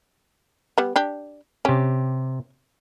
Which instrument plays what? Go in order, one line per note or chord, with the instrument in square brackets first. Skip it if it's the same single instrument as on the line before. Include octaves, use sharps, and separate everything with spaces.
[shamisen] G3 B3
D4 G4
[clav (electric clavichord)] C3 G4 [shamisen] C#4